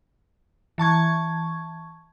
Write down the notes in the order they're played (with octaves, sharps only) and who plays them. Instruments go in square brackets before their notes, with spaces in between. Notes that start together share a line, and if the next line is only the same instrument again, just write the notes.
[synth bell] E3 A5 C#6 G#6